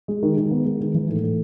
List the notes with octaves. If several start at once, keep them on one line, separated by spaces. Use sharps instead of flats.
G#3
D#3
D#3
B3
G#3
D#3
E3
A2
A2